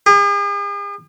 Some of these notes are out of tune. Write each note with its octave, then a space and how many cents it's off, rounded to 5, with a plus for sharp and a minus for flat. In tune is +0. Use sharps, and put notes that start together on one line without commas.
G#4 -45